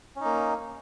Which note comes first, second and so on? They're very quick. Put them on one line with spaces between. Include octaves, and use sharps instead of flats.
C#4 D#4 A#3